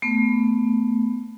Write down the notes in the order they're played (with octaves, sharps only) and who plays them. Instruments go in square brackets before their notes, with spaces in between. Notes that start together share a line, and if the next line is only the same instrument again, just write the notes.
[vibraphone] A3 B3